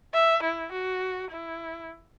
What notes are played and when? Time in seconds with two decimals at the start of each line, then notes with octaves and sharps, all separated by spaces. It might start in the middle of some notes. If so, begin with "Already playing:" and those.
0.14 E5
0.43 E4
0.72 F#4
1.31 E4